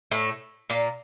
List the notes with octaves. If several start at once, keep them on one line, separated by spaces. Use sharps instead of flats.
A2 A3
A#2 A#3